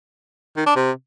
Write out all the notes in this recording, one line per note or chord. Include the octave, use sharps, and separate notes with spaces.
D#3
D4
C3